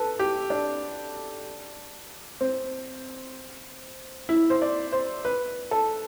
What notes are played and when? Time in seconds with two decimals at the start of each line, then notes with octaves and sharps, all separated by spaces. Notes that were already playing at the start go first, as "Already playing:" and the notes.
Already playing: A4 B4
0.19 G4
0.50 D4
2.41 C4
4.29 E4
4.50 C5
4.62 D5
4.93 C5
5.25 B4
5.71 A4